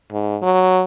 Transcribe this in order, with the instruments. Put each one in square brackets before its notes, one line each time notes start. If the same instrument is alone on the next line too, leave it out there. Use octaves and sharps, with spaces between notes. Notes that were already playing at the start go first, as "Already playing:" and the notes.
[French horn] G#2
F#3